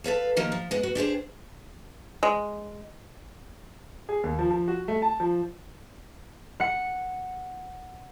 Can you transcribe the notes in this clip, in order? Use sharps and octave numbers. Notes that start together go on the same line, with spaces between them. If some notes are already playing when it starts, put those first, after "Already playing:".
A4 B4 C#5 F5
D#3 F3 A#3 G4
F3
G#3 B3
F#4
D4 G4 G#4 C5
G#3
G#4
D#2
F3
F3
F#4
A3
A5
F3
F#5 C#7